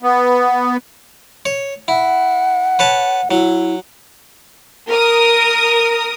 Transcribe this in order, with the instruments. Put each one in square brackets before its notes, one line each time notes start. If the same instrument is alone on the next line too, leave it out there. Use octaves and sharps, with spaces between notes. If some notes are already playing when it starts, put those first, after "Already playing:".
[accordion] B3
[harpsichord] C#5
[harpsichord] E4 [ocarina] F#5
[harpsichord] B4 C#5 A5
[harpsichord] F#3 [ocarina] E4
[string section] A#4 D#6